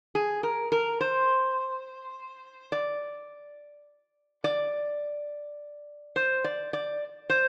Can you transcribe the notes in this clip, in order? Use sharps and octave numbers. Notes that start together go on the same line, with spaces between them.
G#4
A#4
A#4
C5
D5
D5
C5
D5
D5
C5